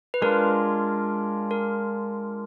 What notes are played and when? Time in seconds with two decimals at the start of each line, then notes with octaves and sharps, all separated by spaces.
0.14 B4
0.22 G#3 D4 F4 A#4
1.51 A#4